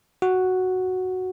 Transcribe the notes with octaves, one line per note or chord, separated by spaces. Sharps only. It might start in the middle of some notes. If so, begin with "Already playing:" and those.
F#4